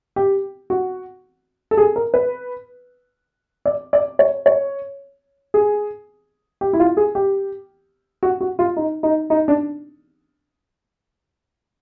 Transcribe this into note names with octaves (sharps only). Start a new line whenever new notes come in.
G4
F#4
A4
G#4
A#4
B4
D5
D5
C#5
C#5
G#4
G4
E4
F4
G#4
G4
F#4
F#4
F4
D#4
D#4
D#4
D4